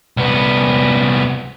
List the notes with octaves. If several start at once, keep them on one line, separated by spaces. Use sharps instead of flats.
C2 B3